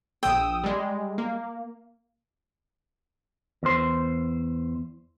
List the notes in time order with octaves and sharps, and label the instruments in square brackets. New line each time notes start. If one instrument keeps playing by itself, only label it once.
[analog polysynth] A#1 D#6 E6 [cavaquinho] G5
[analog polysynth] G3 G#3
A#3
[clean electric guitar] E2 C5